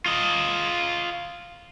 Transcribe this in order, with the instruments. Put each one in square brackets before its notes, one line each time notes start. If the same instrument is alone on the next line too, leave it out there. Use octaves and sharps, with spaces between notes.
[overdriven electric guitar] F4 D#5